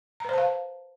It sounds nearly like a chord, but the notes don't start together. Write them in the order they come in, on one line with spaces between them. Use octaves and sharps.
A#5 B4 C5 A5 F5